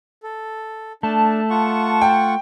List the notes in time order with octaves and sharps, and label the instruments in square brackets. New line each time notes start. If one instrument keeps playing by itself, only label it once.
[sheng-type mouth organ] A4
[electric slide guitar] A3 [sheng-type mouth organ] D4 [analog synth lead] A5
[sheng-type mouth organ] F4 F#5 C#6
[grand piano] G5